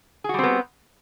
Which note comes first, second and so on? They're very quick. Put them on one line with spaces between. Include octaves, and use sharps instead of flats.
G#4 F#4 G3 C4 B3